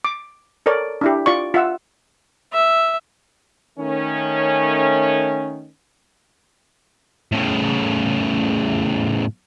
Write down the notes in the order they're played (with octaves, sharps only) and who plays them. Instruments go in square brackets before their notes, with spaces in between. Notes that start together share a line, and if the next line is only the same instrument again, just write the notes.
[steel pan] D6
A4 A#4 C#5 D5
D4 E4 G4
F4 D5 C#6
F4 E5 F#5 E6
[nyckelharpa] E5
[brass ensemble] D#3 A3 C#4
[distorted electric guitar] A2 C#3